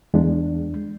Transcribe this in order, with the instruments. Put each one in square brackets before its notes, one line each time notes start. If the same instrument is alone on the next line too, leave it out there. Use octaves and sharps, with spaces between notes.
[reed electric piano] E2 G#3 D4